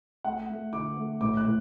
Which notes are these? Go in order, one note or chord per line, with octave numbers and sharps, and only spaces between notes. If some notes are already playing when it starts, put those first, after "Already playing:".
A3 F#5
A3
D3 D6
A3
A2 D6
F#6
A2